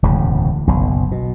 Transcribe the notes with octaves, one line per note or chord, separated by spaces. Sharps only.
E1 D2 A2 C#3
F#1 B1
B2